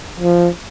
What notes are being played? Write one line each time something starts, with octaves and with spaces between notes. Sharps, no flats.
F3